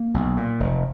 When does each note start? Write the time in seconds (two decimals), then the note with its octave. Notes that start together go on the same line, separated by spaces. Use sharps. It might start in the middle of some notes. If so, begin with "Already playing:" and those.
Already playing: A#3
0.14 B1
0.37 A#2
0.60 F1